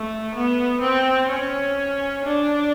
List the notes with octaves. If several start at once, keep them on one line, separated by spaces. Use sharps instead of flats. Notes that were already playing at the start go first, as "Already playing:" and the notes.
Already playing: A3
B3
C4
C#4
D4